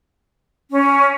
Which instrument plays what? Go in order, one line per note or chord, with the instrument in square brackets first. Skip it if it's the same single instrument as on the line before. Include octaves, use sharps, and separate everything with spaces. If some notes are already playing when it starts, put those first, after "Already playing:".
[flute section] C#4